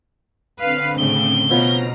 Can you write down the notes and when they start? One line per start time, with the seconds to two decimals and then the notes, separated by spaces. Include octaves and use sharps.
0.60 D3 C4 B4 F5
0.98 A2 C#3 A3 G7
1.50 B2 F3 B3 C#4 A#5 F6 A#6